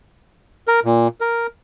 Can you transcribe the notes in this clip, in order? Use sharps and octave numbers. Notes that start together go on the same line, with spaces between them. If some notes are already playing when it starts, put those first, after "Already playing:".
A#4
A#2
A#4